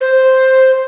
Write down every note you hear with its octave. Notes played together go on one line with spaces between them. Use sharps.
C5